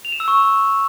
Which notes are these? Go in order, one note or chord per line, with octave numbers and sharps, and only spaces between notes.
F7
E7
E6
C#6